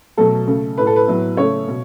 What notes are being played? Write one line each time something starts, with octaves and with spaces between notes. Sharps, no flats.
B2 F#3 A3 A4
C#3 A3
A2 A3 B4
A4
B4
A2 F#3 B3
C#3 A3 C#5
B2